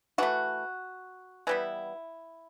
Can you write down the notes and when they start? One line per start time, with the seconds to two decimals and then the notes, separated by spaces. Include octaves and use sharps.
0.18 E3 A3 F#4
1.47 E3 G3 B3 E4